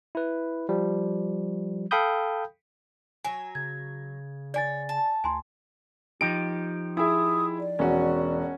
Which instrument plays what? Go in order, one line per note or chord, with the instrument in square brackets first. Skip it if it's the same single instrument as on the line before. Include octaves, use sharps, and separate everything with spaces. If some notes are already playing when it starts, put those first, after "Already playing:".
[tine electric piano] E4 B4
F3 G3
A4 F5 G5 B5 D#6 G6
[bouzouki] F#3 C#5 [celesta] G#5
[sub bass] C#3 [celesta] G#6
[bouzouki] C#5 [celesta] D5 G#5 A6
[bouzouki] A5
[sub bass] D2 [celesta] G#5 A#5 C6
[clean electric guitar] F3 D#4 G4 [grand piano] D7
[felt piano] E4 G#4 E5 [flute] D#6
[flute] D5
[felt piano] E1 [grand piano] C#4 F#4